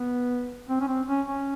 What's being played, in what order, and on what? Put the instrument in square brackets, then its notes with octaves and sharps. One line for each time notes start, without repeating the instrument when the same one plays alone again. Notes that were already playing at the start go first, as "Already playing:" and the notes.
Already playing: [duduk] B3
C4
C#4
C4
C#4
C#4